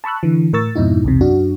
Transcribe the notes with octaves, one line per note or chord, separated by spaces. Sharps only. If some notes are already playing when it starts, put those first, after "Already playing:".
A5 B5 C#6 E6 F#6
D3 E3
A2 A#4 C#6 E6 A6
F2 G#2 B2 D#4 E4
B1 E2 C3
F#2 D4 F#4